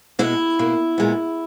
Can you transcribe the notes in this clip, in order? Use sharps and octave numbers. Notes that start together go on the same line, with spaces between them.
B2 G#3 B3 E4
B2 A#3
A#2 G#3 B3